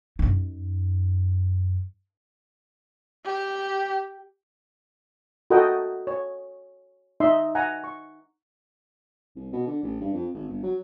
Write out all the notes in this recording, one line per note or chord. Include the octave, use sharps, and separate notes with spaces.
F#2 D#4
G4
F#4 A4 A#4 D#5 F#5 G5
C#5
D#4 D#5 E5 C6
F#5 G#5 A#5
C#6
C2
B2
D3
A1
G2
F2
G#1
G1
F#3